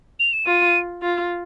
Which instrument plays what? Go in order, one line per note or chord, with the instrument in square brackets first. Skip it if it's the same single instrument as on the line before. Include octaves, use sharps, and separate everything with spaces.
[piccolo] F7
E7
[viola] F4 [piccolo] D#7
[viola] F4